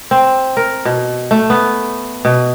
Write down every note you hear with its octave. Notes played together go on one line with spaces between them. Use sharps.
C4
A#4
B2
A3
B3
B2